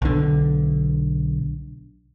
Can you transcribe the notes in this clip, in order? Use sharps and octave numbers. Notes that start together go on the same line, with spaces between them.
B1 D3